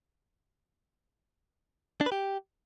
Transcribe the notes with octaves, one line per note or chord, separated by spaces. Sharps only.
D4
B4
G4